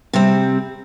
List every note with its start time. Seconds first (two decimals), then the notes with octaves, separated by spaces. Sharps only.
0.13 C3 G3 C4